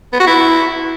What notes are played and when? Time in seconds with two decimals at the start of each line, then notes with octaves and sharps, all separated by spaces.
0.13 B3
0.20 F#4
0.27 E4